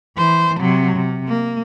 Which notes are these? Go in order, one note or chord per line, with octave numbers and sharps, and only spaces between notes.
E3 C5
C3 F#3
C3
A#3